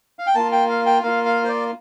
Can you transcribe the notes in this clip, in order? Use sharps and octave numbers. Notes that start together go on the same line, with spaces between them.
F5
G5
A#3 F4 A5
G5
F5
G5
A#3 F4 F5
F5
C5
D5